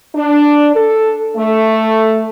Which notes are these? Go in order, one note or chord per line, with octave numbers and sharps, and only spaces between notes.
D4
A4
A3